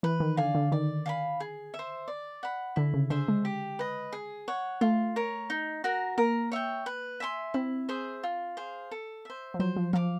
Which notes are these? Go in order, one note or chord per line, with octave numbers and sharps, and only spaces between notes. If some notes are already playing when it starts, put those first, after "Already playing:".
E3 B4
D#3
D3 D5 F5 G#5
D3
D#3 D5
F5 G#5 B5
G#4
E5
C5
D5
F#5 B5
D3 E4
C#3
D3 G#4 C5 E5
G#3
G4
B4 D#5
G#4
C#5 F#5
A3 F4
A#4 C#5
D#4
F#4 A#4
A#3 A#4
C#5 E5 G5
B4
E5 G#5 C6
C4 E4
G#4 C5 E5
F4
G#4 C5 F5
A4
C5 E5
F3
F#3 C5
F3
F3 F5 A5 D6